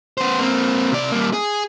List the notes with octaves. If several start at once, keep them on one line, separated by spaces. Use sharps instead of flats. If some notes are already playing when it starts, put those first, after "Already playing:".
B3 C5
A#3 C4
C3 D5
G3 A#3
G#4